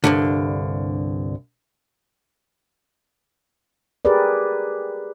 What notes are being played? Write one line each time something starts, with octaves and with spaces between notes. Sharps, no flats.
C2 G2 D3
G4 G#4 A#4 B4 D5